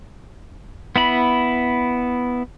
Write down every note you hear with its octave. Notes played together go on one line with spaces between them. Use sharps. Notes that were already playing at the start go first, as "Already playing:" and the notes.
B3 E4 B5